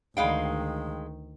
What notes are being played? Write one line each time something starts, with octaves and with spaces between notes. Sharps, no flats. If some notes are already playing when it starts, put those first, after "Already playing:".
D2 D#3 G#3 F5 G5